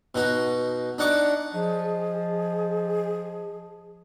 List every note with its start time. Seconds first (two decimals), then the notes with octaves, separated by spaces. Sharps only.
0.15 B2 D#4 F#4
0.98 D4 D#4 F#5 C#6 D6
1.54 F3 G#4 D#5